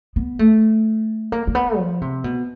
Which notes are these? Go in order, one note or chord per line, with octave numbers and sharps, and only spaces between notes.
B3
A3
A#3
A#3
B3
F3
C3
B2